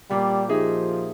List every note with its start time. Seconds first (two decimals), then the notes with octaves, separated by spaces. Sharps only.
0.10 A#2 G3 G4
0.49 F3 D#4 G#4 E5